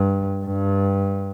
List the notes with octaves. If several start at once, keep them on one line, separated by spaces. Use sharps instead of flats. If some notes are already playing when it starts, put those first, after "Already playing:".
Already playing: G2
G2